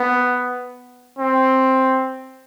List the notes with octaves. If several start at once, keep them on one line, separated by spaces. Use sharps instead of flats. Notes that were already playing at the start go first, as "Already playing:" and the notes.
Already playing: B3
C4